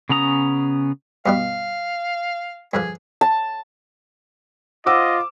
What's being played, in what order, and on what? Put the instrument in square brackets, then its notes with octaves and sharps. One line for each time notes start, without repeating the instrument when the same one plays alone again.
[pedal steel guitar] C#3 B3 C#4 A#5 D#6
[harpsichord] G2 B2 G3 [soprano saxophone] F5
[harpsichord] G2 D3 F3 [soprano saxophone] G#4
[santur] A5
[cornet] F4 [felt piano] C5 F#5 E6 [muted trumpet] D#5 [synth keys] D6